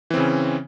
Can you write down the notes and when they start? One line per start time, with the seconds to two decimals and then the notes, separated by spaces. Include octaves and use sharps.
0.11 E3
0.14 C4
0.17 C#3
0.20 C#4